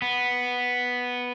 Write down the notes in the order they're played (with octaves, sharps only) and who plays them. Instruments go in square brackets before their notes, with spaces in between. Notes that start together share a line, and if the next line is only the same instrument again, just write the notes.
[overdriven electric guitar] B3